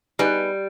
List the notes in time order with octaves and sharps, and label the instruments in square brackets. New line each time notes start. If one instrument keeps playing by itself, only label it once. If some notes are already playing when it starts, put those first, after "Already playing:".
[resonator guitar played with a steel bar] G3 [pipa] B3 D#4 G#4 B4